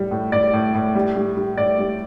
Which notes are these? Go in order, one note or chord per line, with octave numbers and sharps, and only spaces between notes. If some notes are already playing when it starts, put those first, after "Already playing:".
Already playing: A2 G3
A2
A2 D5
A2
A2
G3
G3
G3
A2 D5
G3